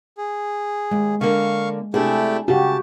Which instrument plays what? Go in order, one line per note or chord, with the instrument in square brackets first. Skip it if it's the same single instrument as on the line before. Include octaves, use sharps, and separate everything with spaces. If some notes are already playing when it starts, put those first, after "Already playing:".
[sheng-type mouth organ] G#4
[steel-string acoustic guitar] D#2 [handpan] G#3
[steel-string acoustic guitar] D3 A#3 [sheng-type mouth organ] F5 C#6
[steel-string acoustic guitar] C3 D4 E4 [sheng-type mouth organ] A3 G4 [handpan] G#4
[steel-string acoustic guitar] C#3 [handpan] F#4 G4 [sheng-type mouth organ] A5